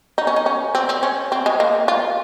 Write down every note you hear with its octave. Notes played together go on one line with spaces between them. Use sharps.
D#4
C#4
D#4
C#4
C4
C4
C#4
C4
G#3
A#3
F4